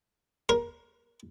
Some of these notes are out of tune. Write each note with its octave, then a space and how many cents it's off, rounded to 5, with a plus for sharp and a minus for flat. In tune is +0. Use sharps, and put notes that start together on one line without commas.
A#4 +20